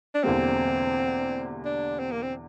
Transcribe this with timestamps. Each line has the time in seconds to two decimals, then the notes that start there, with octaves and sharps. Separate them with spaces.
0.15 D4
0.24 E1 E2 D3 G3 A#3 C4
1.65 D4
2.00 C4
2.11 A#3
2.23 C4